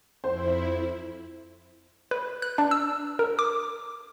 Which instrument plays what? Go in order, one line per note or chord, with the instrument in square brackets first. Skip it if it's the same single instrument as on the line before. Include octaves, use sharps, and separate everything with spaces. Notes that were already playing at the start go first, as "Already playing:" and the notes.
[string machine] F2 E4 [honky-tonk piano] C5
[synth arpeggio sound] B4
F#6
D4
E6
A#4
D6